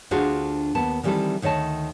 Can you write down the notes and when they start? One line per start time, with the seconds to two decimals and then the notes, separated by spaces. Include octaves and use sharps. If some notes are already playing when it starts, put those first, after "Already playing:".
0.11 D2 D4 F4 F#4 G#4 C5
0.75 D#2 B3 A5
1.03 D#3 E3 G3 C4 E4 A4
1.42 D2 D#3 C#5 D#5 A5